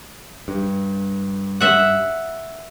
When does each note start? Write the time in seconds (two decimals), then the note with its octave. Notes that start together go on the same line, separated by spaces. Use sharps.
0.48 G2
1.61 E5 F#5